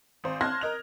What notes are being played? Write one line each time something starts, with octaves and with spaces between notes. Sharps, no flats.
G#1 C5
A5 C6 F6 F#6 G#6 A#6
A#4 D#5 F7